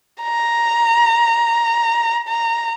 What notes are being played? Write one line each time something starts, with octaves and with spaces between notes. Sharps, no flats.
A#5
A#5